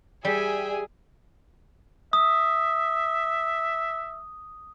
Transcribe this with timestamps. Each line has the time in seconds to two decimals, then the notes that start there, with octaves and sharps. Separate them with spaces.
0.25 G3 G#4 E5 G5 G#5
2.13 E5 D#6